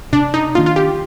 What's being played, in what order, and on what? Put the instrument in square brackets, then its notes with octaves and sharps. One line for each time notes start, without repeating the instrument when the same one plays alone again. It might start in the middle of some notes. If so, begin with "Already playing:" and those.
[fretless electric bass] C3 [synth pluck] D4
[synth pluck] D#4
[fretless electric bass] D#3 A#3 D4 [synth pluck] F4
[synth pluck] F4
G4